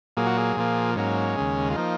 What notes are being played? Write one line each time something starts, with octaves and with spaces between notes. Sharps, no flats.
A#2 F#3 A#3 G#4
F#4
G#4
A#2 F3 A#3
G#2 F#3 A#3 C#4
D#2 C#3 G#3
F4
F3 A#3 D#4